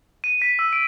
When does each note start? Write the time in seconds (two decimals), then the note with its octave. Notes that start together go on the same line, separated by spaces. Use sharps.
0.24 D#7
0.42 B6
0.59 E6
0.73 D7